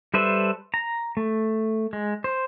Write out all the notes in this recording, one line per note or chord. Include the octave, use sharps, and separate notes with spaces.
G3 A4 B4 C5 E5
A#5
A3
G#3
C5